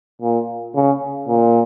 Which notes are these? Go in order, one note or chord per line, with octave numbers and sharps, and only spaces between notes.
A#2
C#3
A#2